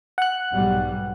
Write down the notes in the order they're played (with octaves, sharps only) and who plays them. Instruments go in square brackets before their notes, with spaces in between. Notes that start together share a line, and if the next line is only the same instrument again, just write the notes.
[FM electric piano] F#5 F#6
[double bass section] B1 G#2 G3